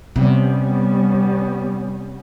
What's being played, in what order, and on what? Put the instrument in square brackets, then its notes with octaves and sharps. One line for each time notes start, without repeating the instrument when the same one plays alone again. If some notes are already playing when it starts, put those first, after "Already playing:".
[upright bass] C3 [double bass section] G3 B3 C#4